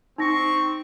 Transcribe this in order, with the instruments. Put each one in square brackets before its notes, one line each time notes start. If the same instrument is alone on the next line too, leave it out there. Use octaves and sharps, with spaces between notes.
[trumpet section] C4 C#6 [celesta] D#4 A#6